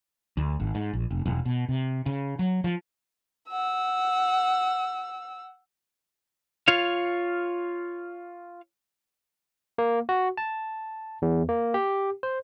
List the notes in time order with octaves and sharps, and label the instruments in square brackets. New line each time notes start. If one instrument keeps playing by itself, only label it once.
[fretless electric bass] D2
G#1
G#2
A#1
F1
E1
B2
C3
C#3
F#3
F3
[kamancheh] F#5 E6
[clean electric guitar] F4 C#5 F5
[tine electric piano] A#3
F#4
A5
E2
A#3
G4
C5